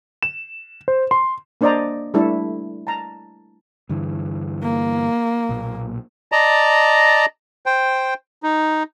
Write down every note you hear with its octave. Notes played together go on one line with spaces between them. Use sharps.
E7
C5
C6
A#3 D4 C5 D5 D#5 A#5
G3 A3 D4 E4 A4
A5 A#5
G2 D3 E3
A#3
B1 A#2
D5 D#5 A5 A#5
C5 G5
D#4